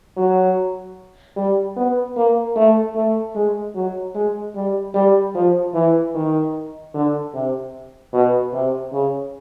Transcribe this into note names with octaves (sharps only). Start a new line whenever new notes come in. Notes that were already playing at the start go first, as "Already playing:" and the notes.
F#3
G3
B3
A#3
A3
A3
G#3
F#3
G#3
G3
G3
F3
E3
D#3
D3
C3
B2
C3
C#3